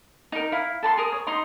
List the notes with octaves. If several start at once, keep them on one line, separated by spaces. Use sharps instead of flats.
D#4 A#4
E4 F5
A4 A5 B5 C6
G#4 A#4 D#6
C#5
D#4 A#5 C6 D#6